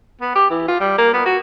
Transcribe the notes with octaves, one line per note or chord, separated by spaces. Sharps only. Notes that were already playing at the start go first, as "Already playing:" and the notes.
B3
G4
E3
F4
G3
A#3
B3
F#4